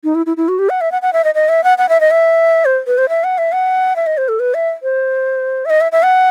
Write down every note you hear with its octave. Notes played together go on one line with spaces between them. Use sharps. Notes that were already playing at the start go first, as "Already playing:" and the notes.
D#4
E4
E4
E4
F#4
G4
F#5
E5
F#5
F#5
E5
D#5
D#5
E5
F#5
F#5
E5
D#5
E5
C5
B4
C5
E5
F#5
E5
F#5
E5
D#5
C5
A4
B4
E5
C5
E5
D#5
E5
E5
F#5